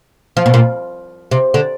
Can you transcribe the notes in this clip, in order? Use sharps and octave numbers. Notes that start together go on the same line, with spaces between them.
F3
B2
A#2
C3
D3